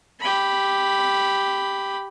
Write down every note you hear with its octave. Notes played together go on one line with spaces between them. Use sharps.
G4 B5